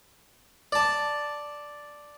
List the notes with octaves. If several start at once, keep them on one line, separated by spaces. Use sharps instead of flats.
D5 A5